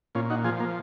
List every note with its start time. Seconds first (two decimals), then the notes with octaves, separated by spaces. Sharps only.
0.15 A#2 C#4 F4
0.30 D#4 F#4
0.44 F3 F4 G#4
0.60 A#3